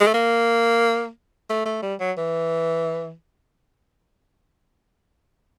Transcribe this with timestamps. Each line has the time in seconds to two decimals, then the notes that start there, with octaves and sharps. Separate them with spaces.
0.01 G#3
0.07 A3
0.14 A#3
1.50 A3
1.66 A3
1.83 G3
2.00 F#3
2.17 E3